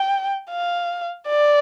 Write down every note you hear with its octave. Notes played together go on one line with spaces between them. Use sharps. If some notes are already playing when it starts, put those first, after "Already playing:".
Already playing: G5
F5
D5